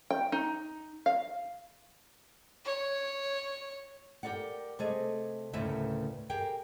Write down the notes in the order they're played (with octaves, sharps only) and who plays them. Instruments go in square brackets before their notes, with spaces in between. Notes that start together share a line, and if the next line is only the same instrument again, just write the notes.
[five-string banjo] G5
D#4
F5
[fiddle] C#5
[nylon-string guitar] G4 G#4 A#4 D5 F#5
C3 A3 G#4 D#5
D2 A2 C#3 A#4 B4 E5
G4 G#4 A#4 G5